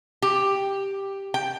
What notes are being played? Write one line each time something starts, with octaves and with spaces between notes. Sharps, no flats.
G4
G5